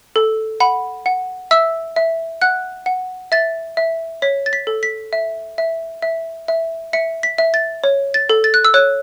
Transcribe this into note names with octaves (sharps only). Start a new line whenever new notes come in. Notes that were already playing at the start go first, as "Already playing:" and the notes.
A4
F#5 B5
F#5
E5 E6
E5
F#5 F#6
F#5
E5 A6
E5
C#5 B6
A6
B6
A4
B6
E5
E5
E5
E5
E5 C#7
B6
E5
A6
C#5
A6
A4
A6
F#6
E6
C#5 F#6